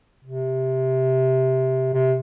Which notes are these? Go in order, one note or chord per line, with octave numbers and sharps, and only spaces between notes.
C3
C3